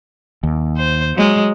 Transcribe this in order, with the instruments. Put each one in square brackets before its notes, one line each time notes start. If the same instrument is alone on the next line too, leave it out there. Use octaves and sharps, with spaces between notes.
[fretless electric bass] D#2
[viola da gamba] C5
F#3 G#3